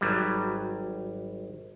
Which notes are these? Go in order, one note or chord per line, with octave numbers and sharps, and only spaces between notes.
G#1 F#3 G3